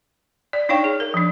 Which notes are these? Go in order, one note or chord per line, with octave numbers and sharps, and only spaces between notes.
D5
D4 D#4 C#5 F5 G5 C#6
G#4
A#4
F3 D4